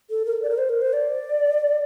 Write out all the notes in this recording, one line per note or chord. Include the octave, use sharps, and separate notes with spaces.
A4
A#4
D5
A#4
C5
A#4
C5
D5